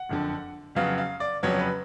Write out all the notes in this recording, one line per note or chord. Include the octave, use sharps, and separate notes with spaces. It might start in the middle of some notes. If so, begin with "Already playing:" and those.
Already playing: F#5
F#1 F2 D3
F2 C#3 F#3 B3 F5
F5
D5
F2 C#3 F#3 B3 C#5
B4